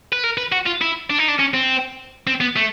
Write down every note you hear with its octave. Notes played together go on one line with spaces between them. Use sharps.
B4
A#4
B4
F#4
F4
E4
D4
D#4
D4
C#4
C4
C4
B3
A3